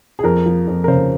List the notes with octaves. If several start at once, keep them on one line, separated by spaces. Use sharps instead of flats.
G#4
F2 A#4
F3
F2
A#4
C#3 C5